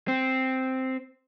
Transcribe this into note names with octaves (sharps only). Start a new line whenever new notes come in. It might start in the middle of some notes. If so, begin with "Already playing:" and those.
C4